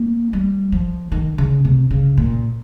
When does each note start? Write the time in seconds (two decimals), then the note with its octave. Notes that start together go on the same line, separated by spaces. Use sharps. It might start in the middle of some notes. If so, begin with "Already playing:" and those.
Already playing: A#3
0.33 G3
0.72 F3
1.12 D#3
1.38 C#3
1.65 C3
1.91 C#3
2.17 A#2